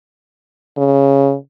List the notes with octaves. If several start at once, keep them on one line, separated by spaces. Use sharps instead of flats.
C#3